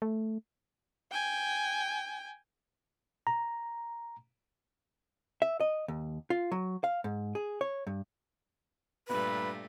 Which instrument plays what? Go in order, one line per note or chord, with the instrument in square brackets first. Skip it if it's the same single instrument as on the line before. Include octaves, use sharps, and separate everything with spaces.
[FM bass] A3
[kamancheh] G5 G#5
[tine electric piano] A#5
[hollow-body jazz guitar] E5
D#5
D#2
F4
F#3
F5
G#2
G#4
C#5
G2
[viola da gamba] G2 A#2 A3 [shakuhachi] B4